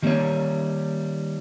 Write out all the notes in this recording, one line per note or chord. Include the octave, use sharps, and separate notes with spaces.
D#3 G3 A#3 C4 C#4 C#5